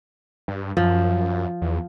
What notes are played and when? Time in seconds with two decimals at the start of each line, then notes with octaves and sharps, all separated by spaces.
0.48 G2
0.77 F#2 F3
1.62 E2